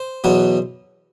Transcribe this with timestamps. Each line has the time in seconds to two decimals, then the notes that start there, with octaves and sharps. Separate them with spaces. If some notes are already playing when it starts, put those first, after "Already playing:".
Already playing: C5
0.24 E2 B2 F#3 B3